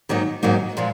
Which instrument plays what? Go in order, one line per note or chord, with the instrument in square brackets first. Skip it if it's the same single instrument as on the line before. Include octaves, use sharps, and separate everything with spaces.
[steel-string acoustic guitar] G#2 D#3 F#3 A#3 D#4
G#2 D#3 F#3 A#3 D#4
A#2 F3 G#3